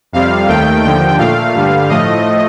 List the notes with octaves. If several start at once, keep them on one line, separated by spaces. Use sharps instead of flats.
F2 C3 G3 F5
D#2 D#3 A3 G5
D#2 D3 F3 G5
A#2 A3 F5
G2 D3 G3
A2 F3 A3 D#5